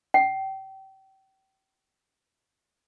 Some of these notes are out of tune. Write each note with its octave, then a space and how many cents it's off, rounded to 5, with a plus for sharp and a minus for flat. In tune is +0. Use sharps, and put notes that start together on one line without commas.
G5 -30